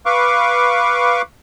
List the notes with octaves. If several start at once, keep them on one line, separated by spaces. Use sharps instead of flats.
B4 F5 C#6 D6